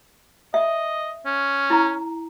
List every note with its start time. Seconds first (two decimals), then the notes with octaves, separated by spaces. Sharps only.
0.54 D#5 E5
1.25 C#4
1.70 E4 A#5